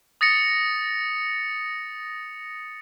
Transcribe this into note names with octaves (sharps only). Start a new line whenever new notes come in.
D#6 A6 A#6 C#7 F7